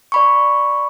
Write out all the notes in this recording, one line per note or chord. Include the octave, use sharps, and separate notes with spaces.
D5 B5 C#6